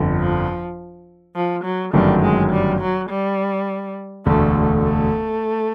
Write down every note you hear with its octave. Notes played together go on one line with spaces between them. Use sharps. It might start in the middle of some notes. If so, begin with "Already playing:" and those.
Already playing: G1 F2 D3
F3
F3
F#3
G1 F#2 D#3 F#3 G3 A3
G#3
G3
F#3
G3
E1 D2 D3 A3
A3